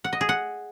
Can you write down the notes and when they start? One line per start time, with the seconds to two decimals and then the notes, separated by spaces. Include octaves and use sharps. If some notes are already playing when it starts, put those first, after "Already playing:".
0.04 F#5
0.13 D#5
0.21 G#4
0.29 F#5